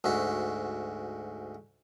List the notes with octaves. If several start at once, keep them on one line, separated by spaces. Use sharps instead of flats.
D2 G#2 F#4